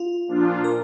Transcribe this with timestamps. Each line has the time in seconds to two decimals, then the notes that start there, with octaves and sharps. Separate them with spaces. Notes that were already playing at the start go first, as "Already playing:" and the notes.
Already playing: F4
0.27 A#2 F3 D4 F4
0.64 A#4